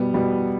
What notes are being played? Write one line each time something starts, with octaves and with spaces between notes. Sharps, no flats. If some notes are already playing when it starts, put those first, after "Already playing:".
Already playing: B2 G3 B3
B2 G3